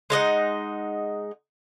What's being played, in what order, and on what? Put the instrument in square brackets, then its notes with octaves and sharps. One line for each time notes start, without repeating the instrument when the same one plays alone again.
[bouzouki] G#3 D#4 D#5 F#5